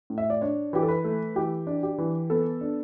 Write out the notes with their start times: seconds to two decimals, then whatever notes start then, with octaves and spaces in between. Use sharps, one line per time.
0.10 A2
0.18 E5
0.30 D5
0.41 D4 C#5
0.73 E3 G4
0.82 A4
0.88 B4
1.04 A3
1.36 E3 G4
1.67 D4
1.83 G4
1.98 E3
2.30 B3 A4
2.61 D4